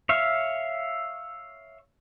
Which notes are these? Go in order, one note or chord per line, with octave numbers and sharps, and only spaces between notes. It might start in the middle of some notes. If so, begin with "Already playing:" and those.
C#5 E5 F5